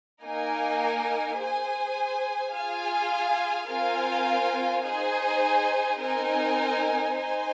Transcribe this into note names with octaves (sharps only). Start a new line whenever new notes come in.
A#3 D#4 A#4 G#5
G#4 C5 G#5
F4 G#4 F5 G#5
C4 F4 A#4 F5 G#5
D#4 G#4 C5 G#5
C4 D#4 A#4 G#5
D#4 C5 G#5